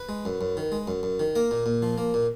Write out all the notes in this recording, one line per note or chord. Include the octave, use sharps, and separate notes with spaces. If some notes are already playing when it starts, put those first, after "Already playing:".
Already playing: B4
G#3
F#2
F#2
D#3
G#3
F#2
F#2
D#3
A#3 A#4
A#2
A#2
F3
A#3
A#2